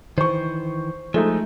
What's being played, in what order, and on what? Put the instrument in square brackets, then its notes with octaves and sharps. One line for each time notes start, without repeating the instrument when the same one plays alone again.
[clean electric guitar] D#3 E3 [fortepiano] C5 C#6
[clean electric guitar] F3 [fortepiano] G#3 A3 D#4